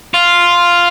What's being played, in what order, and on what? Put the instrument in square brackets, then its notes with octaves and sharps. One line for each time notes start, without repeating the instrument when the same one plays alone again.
[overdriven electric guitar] F4